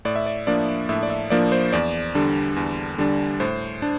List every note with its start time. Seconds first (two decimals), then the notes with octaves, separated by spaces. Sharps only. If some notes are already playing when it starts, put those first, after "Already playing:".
0.05 A2 D5
0.16 E5
0.26 D5
0.47 F3 A#3 D4 D5
0.89 A2 E5
1.03 D5
1.10 E5
1.30 F3 A#3 D4 D5
1.52 C5
1.72 E2 D5
2.15 D3 G3 D4
2.56 E2
2.98 D3 G3 D4
3.40 A2 C5
3.82 D4